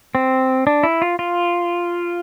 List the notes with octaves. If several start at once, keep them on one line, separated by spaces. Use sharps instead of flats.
C4
D4
E4
F4
F4